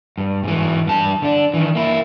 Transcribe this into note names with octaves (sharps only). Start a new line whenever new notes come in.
G2
G#2 E3
G2 A5
D3 D4
D#3 E3
A#3 E4